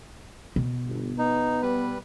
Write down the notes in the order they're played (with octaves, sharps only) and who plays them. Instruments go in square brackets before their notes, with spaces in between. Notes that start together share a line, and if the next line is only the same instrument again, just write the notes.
[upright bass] B2
[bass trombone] G1
[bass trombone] B3 [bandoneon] D#4
[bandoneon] G3 B4